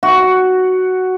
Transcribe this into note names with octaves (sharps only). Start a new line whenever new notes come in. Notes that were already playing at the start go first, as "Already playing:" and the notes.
F#4